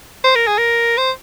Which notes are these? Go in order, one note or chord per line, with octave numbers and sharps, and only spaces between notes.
C5
A#4
G#4
A#4
C5